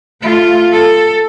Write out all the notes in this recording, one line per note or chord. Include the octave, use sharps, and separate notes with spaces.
A3 F4
A4